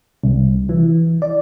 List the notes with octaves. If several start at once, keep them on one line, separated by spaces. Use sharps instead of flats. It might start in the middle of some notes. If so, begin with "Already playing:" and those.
C2
E3
D5